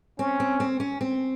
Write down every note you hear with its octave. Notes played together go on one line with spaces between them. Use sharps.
C4 C#4
C4
C4
C#4
C4